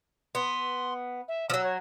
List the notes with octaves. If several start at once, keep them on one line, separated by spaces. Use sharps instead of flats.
B3 C6
E5
F3 F#3 E6
C#5